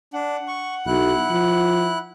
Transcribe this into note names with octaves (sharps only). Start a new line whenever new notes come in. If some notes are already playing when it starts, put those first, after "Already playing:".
D4 F#5
C#6
B1 E4 F#6
F3